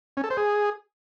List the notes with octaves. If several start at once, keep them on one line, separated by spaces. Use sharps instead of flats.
C#4
A4
C5
G#4